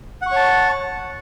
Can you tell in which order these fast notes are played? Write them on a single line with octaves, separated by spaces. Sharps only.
F#5 C#6 C#5 A5